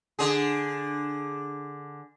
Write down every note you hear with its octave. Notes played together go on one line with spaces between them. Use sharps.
D3 G#4